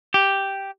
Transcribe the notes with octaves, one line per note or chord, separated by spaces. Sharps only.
G4